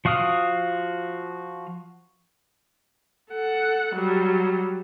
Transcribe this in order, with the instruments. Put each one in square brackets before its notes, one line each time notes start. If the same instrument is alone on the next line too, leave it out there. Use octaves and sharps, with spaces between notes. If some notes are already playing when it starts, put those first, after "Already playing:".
[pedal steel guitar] F3 F#4 F5 D#6 F6
[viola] A4 F#5
F#3 G3